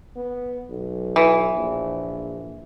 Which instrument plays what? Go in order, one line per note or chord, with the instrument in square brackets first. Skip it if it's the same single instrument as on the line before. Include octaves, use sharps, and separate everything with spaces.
[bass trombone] B3
B1
[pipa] E3
[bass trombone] A#1